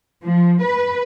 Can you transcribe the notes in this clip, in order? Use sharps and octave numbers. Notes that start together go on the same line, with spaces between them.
F3
B4